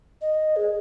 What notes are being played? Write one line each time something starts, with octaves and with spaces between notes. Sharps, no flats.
D#5
G#4